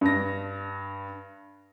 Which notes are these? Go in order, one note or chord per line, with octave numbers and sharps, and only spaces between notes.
G2 A#6